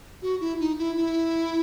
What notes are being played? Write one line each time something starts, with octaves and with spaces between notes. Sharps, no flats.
F#4
E4
D#4
E4
E4